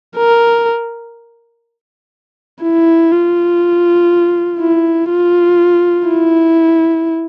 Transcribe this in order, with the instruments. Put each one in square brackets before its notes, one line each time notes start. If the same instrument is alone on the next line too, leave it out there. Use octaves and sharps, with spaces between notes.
[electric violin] A#4
E4
F4
E4
F4
E4